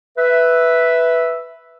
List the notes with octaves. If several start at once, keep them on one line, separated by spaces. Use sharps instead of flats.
B4 E5